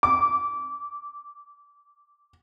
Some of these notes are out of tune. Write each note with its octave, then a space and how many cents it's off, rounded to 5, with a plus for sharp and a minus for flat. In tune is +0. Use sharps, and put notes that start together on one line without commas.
D6 -20